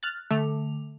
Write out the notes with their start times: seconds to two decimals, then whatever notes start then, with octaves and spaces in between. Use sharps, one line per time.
0.03 F6 F#6 A6
0.31 D3 A3 F7